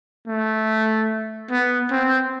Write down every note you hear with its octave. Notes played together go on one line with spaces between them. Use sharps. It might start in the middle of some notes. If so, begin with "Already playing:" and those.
A3
B3
C4